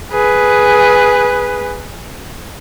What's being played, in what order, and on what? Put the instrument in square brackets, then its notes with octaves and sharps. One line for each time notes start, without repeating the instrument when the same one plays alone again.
[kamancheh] G#4 B4